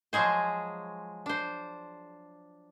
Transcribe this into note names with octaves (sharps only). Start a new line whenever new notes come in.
F3 F#3 G#3 G#4 C5
D4 C5